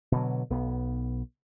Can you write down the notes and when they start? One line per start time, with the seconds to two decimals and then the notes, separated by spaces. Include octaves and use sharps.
0.12 B2 D3 F#3
0.50 B1 B3